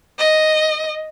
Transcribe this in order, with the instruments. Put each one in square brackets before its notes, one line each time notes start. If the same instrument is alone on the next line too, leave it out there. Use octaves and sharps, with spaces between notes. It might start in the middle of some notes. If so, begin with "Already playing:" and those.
[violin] D#5